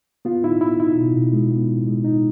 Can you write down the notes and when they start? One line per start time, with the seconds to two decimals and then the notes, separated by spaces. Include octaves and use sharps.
0.25 B3 F4
0.44 D#4 E4
0.61 B3 E4
0.80 D#4 E4
0.97 B2
1.15 B2
1.33 G#3
1.50 B3
1.68 B2
1.87 G#3
2.04 D#4